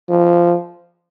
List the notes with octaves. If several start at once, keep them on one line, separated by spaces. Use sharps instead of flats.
F3